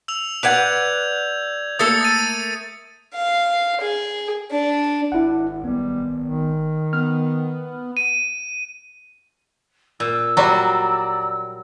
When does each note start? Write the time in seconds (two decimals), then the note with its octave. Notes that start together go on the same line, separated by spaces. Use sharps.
0.08 E6 F7
0.43 B4 D5 F#5 G6 G#6 F7
1.79 A3 A#3 A4 D#6 A6 C#7
2.01 D#6 A6 D#7
3.14 F5
3.81 G#4
4.51 D4
5.12 G#1 D4 E4 F#5
5.63 B1 G3 B3
6.23 D#3
6.93 B3 F6
7.97 D#7
10.00 A#2 E6
10.37 F#3 G3 F#4 D5 A#5